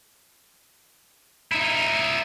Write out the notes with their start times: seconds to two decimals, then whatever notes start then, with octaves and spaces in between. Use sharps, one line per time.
1.52 D#4 E4